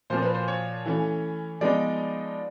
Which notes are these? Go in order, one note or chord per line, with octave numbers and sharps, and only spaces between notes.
A#2 F3 A#3 C5
B4
C5
C#5
E3 A3 C#4
F3 G#3 B3 D#4 D5